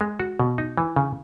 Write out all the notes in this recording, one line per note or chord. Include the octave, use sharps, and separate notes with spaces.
G#3
F#4
B2
D#4
E3
C#3